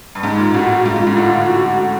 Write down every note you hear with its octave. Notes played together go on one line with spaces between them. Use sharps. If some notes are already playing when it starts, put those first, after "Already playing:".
G2
G#2 D#4
A#2
A2 F#4
G#2 F4
G#2
A2
D3 F4
F#4